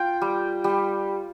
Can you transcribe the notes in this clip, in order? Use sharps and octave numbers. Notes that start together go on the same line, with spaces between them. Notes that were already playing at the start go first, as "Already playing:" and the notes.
Already playing: F4 G5
G3
G3